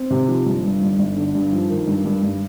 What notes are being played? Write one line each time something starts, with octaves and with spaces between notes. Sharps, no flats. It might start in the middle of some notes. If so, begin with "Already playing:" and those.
Already playing: C4
C3
F3
G1
G2
G1
G1
D3
G2
F3
D#3
G2
G2
G2